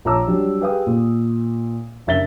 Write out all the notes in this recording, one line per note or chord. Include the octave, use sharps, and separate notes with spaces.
A#1 C#5 A5 A#5 D6 E6
F#3 G3 D4 G4
G4 G#4 B4 F5 G5 D#6
A#2
F#1 D4 E5 A6 B6 G7